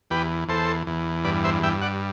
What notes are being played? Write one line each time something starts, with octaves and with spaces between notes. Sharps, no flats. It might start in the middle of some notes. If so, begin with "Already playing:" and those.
E2 G4 B4
E2 A4 C5
E2
G2 B4 D5
C5 E5
G2 E5 G5
D5 F#5